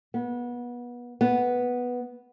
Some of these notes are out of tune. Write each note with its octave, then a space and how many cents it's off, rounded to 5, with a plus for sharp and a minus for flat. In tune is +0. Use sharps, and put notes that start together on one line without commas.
B3 -25
B3 -5